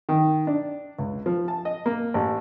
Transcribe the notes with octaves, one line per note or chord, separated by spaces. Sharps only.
D#3
D4
C#2
F3
A5
D#5
A#3
A1